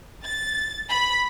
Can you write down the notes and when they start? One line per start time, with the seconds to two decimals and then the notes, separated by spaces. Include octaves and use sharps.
0.24 A6
0.89 B5